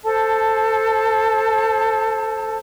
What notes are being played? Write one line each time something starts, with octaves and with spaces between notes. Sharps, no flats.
A4 C5 A5